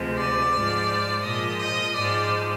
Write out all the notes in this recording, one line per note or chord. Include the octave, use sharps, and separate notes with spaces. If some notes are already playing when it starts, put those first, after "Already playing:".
Already playing: D2 C3 F3 G#3
D5
G#2 F3 G#3
A#2 F3 G#3 D#5
D#5
G#2 F3 G#3 D5